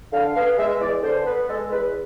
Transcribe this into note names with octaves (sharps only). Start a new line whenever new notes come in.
D3 F5
B3 F5
G#3 E5
E2 D5
D3 C5
B3 B4
G#3 A4
E2 B4